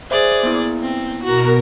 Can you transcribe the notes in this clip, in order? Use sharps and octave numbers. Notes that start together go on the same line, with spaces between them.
G#4 C5 D5 E5
A#3 B3 E4
C4
B2 F#4 A#4 A#5